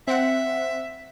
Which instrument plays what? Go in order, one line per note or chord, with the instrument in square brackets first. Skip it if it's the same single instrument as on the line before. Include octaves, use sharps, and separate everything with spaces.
[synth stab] C4 F#5 [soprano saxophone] E5